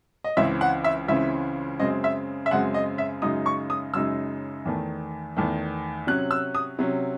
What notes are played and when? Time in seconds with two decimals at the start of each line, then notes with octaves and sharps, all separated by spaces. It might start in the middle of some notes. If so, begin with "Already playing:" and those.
0.24 D#5
0.37 C#2 C#3 E3 C4 E5
0.61 F#5
0.84 E5
1.08 C#2 C#3 E3 C4 E5
1.80 F#2 C#3 G#3 C4 D#5
2.04 E5
2.46 E5
2.51 F#2 C#3 G#3 C4 F#5
2.74 D#5
2.98 E5
3.22 F#2 C#3 G#3 D#4 D#6
3.46 C#6
3.70 D#6
3.94 F#2 C#3 G#3 D#4 E6
4.65 E2 D#3 A3
5.37 E2 D#3 A3
6.07 C3 F#3 C#4 F#6
6.31 E6
6.55 D#6
6.79 C3 F#3 C#4